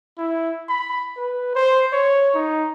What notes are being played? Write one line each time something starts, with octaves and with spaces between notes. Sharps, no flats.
E4
B5
B4
C5
C#5
D#4